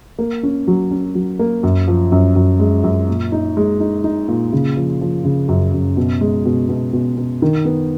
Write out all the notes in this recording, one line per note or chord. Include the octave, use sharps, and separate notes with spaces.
A#3
C#4
F#3
C#4
F#3
A#3
F#2
F3
F#2
F#2
G#3
F#2
A#2
D#4
G#3
D#4
D#4
A#2
C#3
F3
F3
C#3
F#2
F#2
B2
G#3
B2
B2
B2
B2
D#3
B3